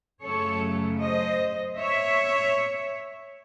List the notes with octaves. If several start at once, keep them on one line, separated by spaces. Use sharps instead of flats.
F#2 C#3 F#3 A3 A4 C#5
C5 D#5
C#5 E5